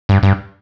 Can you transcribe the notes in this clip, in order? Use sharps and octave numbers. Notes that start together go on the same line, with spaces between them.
G2
G2